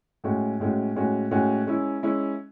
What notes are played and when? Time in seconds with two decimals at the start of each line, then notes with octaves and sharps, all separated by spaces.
0.24 A2 G#3 C#4 F#4
0.60 A2 G#3 C#4 F#4
0.95 A2 G#3 C#4 F#4
1.31 A2 G#3 C#4 F#4
1.67 G#3 C#4 E4
2.03 G#3 C#4 E4